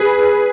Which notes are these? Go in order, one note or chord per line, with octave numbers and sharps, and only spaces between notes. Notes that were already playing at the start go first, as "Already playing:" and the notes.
Already playing: G#4 B4